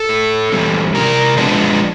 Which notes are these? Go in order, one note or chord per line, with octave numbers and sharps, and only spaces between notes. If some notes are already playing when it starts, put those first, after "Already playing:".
Already playing: A4
A2
E3 G3 C4
C3 A#4
F3 G#3 B3 D4